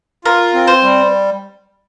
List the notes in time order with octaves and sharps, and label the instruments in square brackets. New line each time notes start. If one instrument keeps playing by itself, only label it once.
[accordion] F4 [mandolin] A#4
[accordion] C4
[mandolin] C5
[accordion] G3